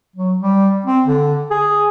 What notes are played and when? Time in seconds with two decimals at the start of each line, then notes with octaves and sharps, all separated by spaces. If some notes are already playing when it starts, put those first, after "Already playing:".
0.16 F#3
0.39 G3
0.86 C4
1.06 D3
1.51 G#4